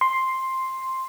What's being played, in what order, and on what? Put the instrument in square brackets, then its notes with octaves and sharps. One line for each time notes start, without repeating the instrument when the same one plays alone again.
[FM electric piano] C6